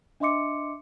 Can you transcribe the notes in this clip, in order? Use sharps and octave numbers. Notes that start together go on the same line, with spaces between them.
D4 D#5 E5 C6 D6 C#7